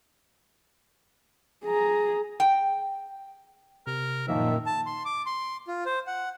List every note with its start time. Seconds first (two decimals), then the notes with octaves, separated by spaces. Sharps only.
1.65 G#4 A#5
2.40 G5
3.87 C3 A#4
4.28 F#2 A#2 D#3 F3 A#3 E5 A5
4.66 A5
4.86 C6
5.05 D6
5.26 C6
5.68 F4
5.86 C5
6.07 F#5